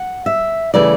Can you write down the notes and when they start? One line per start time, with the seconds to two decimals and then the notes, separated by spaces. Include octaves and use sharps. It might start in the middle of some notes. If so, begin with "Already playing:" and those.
Already playing: F#5
0.26 E5
0.74 C#3 E3 A3 D5